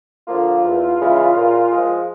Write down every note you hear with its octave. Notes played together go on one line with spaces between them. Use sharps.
D3 F3 A#3 F4
E2
C#3 E3 G#3
A#2
F3 G#3